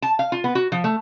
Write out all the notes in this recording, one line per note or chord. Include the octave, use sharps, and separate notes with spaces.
A5
F5
F4
B3
F#4
F3
A3